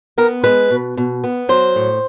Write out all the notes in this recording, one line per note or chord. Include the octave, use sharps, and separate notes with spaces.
B3 A#4
G#3 B4
B2
B2
B3
F#3 C5
A2